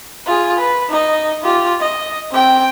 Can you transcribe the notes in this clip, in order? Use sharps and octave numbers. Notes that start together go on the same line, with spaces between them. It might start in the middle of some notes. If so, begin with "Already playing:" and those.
F4 G#4
B4
D#4 D#5
F4 G4
D#5
C4 G5